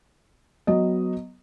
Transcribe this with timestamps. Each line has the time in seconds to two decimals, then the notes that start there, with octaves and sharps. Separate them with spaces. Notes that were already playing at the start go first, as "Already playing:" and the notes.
0.67 F#3 B3 D#5